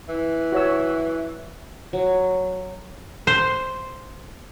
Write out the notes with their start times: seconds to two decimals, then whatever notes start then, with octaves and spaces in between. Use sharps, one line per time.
0.09 E3
0.52 F#4 C#5 E6
1.93 F#3
3.27 C5